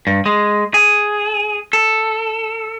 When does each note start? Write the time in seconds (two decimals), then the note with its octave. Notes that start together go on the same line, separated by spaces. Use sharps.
0.07 G2
0.26 G#3
0.74 G#4
1.73 A4